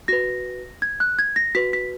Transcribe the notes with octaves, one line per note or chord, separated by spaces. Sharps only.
F#4 B4 A#6
G#6
F#6
G#6
A#6
F#4 B4 B6
B6